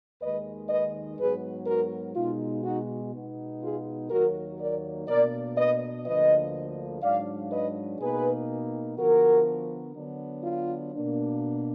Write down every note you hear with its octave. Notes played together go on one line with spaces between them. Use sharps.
D#2 D#3 G#3 B4 D#5
B4 D#5
G#2 F#3 B3 G#4 B4
F#4 A#4
B2 G#3 D#4 F4
D#4 F#4
B2 G#3 B3 D#4
F4 G#4
D#2 D#3 F#3 A#3 F#4 A#4
A#4 D5
B2 A#3 D4 A#4 D5
B4 D#5
D2 D3 F3 A#3 B4 D#5
G#2 F#3 D4 D5 F5
B4 D#5
B2 A#3 D#4 G#4 B4
D3 F3 B3 F#4 A#4
D3 F#3 B3 D4
F4
B2 A#3 D4